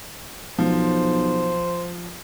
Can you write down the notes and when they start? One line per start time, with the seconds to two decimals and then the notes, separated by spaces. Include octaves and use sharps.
0.58 B1 F3 C5